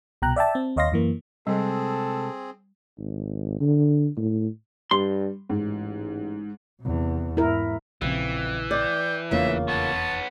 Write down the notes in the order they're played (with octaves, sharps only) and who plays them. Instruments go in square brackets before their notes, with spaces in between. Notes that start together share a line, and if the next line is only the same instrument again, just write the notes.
[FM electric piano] C2 B2 G5 A#5 F#6
D5 E5 G5 A5
C4
D#2 C#5 D#5 F5 C6 A#6
F#2 E3 A#3
[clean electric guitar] C3 G#3 [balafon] G3 [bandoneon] C4 G#4 [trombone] A4
[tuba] G#1
D3
A2
[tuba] G2 [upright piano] G3 [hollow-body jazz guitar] C6
[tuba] A1 [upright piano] G#2
[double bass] E2 C3
[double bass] G#2 [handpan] E4 A#4
[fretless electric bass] A#1 C#3 [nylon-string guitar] F2 [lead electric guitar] E3
[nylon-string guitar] D5 [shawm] G5
[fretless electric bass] F1 E2 D4 [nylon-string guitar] C#3 A#3 F4 [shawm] E5
[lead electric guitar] B3 C#5 [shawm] A5